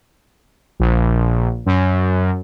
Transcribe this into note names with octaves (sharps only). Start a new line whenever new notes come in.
A#1
F#2